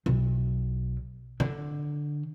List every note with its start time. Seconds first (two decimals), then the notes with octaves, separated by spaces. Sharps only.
0.06 B1
1.40 D3